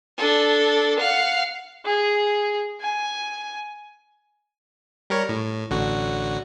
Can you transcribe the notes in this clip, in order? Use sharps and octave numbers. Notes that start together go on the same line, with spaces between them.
D4 A4
F5 F#5
G#4
G#5
G3 A#4 C#5
A2
A1 D3 F#4